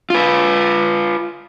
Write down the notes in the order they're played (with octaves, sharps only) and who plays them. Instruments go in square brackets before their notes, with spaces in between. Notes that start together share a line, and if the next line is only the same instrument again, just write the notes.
[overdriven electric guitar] F4 B4